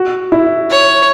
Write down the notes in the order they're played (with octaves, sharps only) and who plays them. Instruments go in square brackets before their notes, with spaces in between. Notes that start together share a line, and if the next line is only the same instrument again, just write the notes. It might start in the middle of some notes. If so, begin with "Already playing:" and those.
Already playing: [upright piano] F#4
E4
[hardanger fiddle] C#5